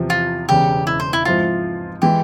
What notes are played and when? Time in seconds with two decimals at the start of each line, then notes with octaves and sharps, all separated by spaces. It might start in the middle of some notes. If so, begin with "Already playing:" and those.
Already playing: E2 C3 F3
0.10 F4
0.49 E1 E2 C#3 G4
0.87 E4
1.00 C5
1.13 E4
1.25 G#2 F3 C4 E4 F4
2.02 E3 G#3 G4